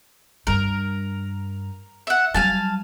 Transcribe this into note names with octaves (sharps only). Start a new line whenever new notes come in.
G2 G3 A#4
E5 F#5
F#3 G3 F5 G#5 A5